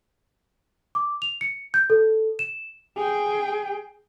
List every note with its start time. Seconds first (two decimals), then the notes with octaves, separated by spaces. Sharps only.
0.95 D6
1.22 F7
1.41 C#7
1.74 G6
1.90 A4
2.39 E7
2.96 G#4 G5